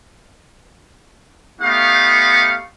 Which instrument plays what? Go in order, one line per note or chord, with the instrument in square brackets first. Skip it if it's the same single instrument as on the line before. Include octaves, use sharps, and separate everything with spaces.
[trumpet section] A3 B3 D#4 G4 F5 C#6